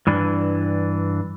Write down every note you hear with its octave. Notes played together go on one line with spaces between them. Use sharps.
G2 E3 D4